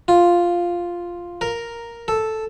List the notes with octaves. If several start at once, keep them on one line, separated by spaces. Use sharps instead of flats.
F4
A#4
A4